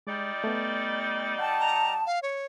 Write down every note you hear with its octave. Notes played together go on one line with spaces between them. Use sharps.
G3 G#3 D#4 D5
A3 B3
F#5 G5 A5
A#5
F5
C#5